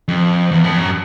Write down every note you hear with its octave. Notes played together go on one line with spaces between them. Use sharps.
F2
E2
F2
F#2